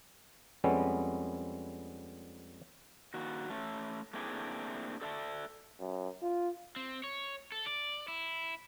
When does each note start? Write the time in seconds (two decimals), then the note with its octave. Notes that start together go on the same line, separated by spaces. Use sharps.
0.64 F2 G3 G#3 B3 C#4
3.14 D#3 A#3 F#4
3.50 A3 C#4
4.13 A3 A#3 C4 D4 E4 G#4
5.01 A4 D5 E5 G5 A5
5.80 F#2
6.22 F4
6.76 C4
7.04 C#5
7.52 A4
7.66 D5
8.08 E4